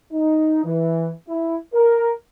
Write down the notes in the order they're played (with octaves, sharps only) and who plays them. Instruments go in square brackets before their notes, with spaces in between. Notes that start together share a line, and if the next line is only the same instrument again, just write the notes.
[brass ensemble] D#4
E3
E4
A#4